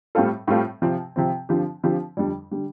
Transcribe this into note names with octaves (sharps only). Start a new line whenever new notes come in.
A2 G3 C4 F4 A4
A2 G3 C4 F4 A4
C3 F3 C4
C3 F3 C4
D3 F3 C4 G4
D3 F3 C4 G4
F2 D3 G3
D3 G3